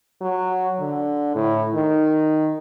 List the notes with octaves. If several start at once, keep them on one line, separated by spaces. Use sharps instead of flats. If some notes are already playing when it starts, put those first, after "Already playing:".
F#3
D3
A2
D#3